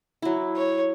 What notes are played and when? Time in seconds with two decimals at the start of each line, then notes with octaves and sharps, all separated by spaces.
0.22 F#3 E4
0.57 C#5